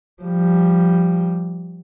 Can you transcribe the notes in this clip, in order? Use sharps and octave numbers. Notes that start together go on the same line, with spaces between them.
F3 G3